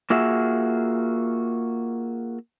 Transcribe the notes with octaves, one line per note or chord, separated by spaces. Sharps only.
A#3 F4 F#4 G#4 E5